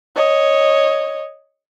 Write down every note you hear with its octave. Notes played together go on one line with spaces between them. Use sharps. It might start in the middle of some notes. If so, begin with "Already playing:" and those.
C#5 D#5